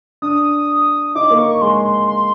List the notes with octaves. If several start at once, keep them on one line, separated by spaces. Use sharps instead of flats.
D4 D#6
D#4 D6
A#3
C#6
G#3 C6
C6